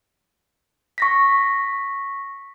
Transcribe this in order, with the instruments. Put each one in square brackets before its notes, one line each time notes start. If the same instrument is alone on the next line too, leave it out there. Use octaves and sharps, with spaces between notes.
[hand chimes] C#6 A#6 B6